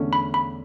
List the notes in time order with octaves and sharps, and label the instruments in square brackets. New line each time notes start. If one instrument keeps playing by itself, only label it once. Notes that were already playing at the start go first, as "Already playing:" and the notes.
Already playing: [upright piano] E2 D3 A3 C#4
[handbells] B5
B5